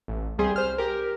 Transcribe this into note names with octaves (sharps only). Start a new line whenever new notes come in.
A1
C2 G3 G#4 C6
C5 F6
G4 A#4